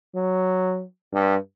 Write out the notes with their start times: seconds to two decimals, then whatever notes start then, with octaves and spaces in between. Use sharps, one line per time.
0.15 F#3
1.13 G2